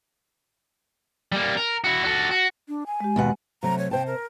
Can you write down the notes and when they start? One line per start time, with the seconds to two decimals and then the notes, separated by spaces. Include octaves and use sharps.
1.32 G3 A#3
1.57 A#4
1.84 E4 F#4
2.05 F#4 A4
2.31 F#4
2.69 D4
2.87 G#5
3.00 G#3 G4
3.16 D#2 B2 F#5
3.63 C3 F#3 A3 A#5
3.78 C#5
3.91 C3 C5 G5 A5
4.07 A#4